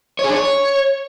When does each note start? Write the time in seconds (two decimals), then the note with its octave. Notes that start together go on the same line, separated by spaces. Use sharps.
0.19 C#5
0.24 G#4
0.29 D4
0.34 C#5